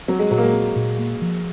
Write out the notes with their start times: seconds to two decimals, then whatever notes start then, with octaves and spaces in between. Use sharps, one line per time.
0.08 F#3 C4
0.19 G#3
0.31 A#2 F#3
0.38 A#3
0.43 G#3
0.53 C4
0.76 A#2
0.99 A#3
1.22 F3